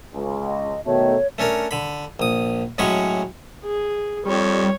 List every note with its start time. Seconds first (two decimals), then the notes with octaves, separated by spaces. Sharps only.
0.14 C#2
0.45 D#5
0.86 B2 D#3 A3 C#5
1.38 A3 C#4 D4 A#4
1.71 D3 B5
2.20 A#1 D#6
2.78 A2 F#3 G#3 C#4 B5 C#6
3.64 G#4
4.25 F2 G3 C#5